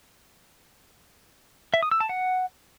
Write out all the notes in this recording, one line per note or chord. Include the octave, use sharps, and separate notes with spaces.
E5
D#6
E6
A5
F#5